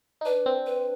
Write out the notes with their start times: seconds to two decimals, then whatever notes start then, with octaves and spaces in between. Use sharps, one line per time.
0.21 D#4
0.25 D4 B4
0.46 C4
0.66 B4